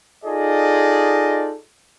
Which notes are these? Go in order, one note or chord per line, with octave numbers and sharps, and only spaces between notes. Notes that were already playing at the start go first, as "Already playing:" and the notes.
D#4 F4 G#4 A4 D5 D#5